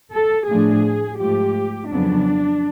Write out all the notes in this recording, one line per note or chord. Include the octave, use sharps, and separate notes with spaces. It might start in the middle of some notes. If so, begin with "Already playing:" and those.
A4
A2 F3 A3 D4 G#4
G#2 F3 A3 G4
F2 C#3 F#3 B3 D4